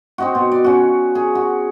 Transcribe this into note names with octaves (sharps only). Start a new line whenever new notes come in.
C4 D#4 F#4
B2
D5
C#4 F#4
G#4
F#4